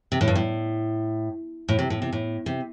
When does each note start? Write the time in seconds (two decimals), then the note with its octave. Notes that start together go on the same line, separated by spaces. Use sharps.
0.12 C3
0.21 A2
0.28 G2
0.35 A2
1.69 A2
1.79 C3
1.90 A2
2.02 C3
2.13 A2
2.46 C3